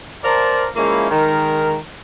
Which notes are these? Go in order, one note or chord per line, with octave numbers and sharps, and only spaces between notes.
A#4 C5 D5 F5 A5 A#5
F3 G#3 A#3 C#4 E4
D#3 G#3 A#4